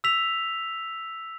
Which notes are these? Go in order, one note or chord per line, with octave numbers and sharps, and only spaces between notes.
E6 B6 F7